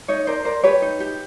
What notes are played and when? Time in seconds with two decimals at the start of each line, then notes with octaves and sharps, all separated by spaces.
0.08 D#4 C#5 D#5
0.27 A#4 C5 D5
0.45 A#4 C5 D5
0.64 G4 B4 C#5
0.82 D#4
1.00 G4